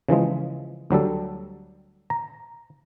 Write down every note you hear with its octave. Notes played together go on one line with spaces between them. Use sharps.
C#3 E3 F3 G#3
D2 F#3 G3 A4
A#5